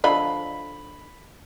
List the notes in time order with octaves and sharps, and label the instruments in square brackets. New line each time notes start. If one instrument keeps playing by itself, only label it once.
[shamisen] D3 F3 D#5 [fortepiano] B5